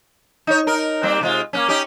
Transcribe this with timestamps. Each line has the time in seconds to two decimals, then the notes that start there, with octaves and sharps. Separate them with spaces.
0.47 D#4 C#5
0.67 D#4 A#4
1.03 G3 A#3 C4
1.21 C3 G#3 F4
1.53 A#3 B3 C#4
1.68 C#4 D#4 G4